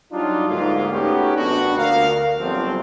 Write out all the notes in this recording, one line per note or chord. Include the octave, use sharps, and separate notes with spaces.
F#3 G3 D4 D#4 F4
D2 G#2 A#3 F4
A3 B3 C#4 D#4 F#4 G4
A#1 B3 D4 F#4
D2 A#4 F5
G1 F3 F#3 C4